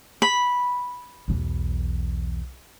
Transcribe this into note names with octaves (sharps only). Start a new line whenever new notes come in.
B5
B1 E2